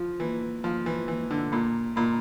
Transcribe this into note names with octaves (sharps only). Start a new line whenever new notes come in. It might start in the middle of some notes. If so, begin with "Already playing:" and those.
Already playing: F3 F4
E3 A#3
F3 A#3
E3
E3 A#3
D3
A#2 A#3
A#2 A#3